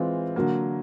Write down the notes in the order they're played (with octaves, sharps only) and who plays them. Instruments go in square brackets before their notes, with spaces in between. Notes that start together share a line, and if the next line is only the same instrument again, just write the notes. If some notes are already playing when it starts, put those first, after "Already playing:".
Already playing: [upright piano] E3 G#3 C4 F4
D3 F#3 A#3